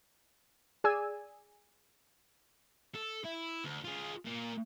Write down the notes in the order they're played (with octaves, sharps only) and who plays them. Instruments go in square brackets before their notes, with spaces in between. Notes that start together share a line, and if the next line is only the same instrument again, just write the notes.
[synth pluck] G#4 D5 G#5 E6
[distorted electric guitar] A4
E4
D2
F4 G#4
A#2